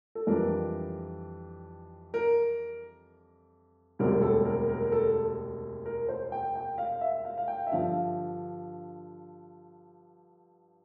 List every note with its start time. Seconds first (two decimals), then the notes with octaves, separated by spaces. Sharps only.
0.15 A4
0.27 F2 E3 G3 D4 A#4
2.14 A#4
3.99 E1 D2 C3 G3 A#4
4.22 A4
4.45 A#4
4.69 A#4
4.82 A#4
4.92 A4
5.86 A#4
6.09 C5
6.32 G5
6.55 G5
6.78 F5
7.01 E5
7.25 F5
7.38 F5
7.48 G5
7.67 E5
7.72 G2 D3 F3 F5